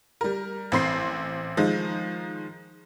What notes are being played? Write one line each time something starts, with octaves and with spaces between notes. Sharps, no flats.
G3 A#4
A1 C4 C6 C7
D#3 F3 G#3